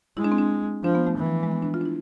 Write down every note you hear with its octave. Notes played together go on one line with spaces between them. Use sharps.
G#3 E4
D4
C4
D4
F3 D4
B3
A3
E3
F3
G#3
B3
D4
F4
D4
E4